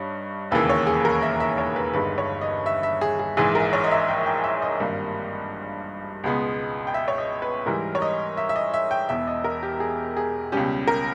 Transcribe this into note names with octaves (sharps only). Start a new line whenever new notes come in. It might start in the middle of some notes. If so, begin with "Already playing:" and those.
Already playing: G2 G3 D#4 C#5
E1 D#2 C#3 E3 A#3 B4
C#5
G#4
A#4
E5
E5
C#5
B4
G1 G2 D#3 G#3 B4
C#5
D#5
E5
E5
G#4
G#4
A#1 G#2 E3 G#4
A#4
C#5
D#5
E5
G5
G5
E5
D#5
G#1 G2 G3 A#3
C#2 B2 G#3 B3
G5
E5
C#5
D#5
B4
G#2 E3 G3 A#4
C#5
D#5
E5
E5
D#5
E5
G5
E1 E2 B2 E5
D#5
A#4
G4
G#4
G#4
C#2 B2 G3 C#4 G4
A#4